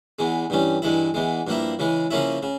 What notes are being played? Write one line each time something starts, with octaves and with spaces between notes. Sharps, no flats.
E2 E3 G#3
G2 E3 G3 C#4
G2 E3 G#3 E4
E2 E3 G#3
G2 F3 A#3 E4
C#3 E3 G#3
C#3 F3 A#3 C#4 E4
C#3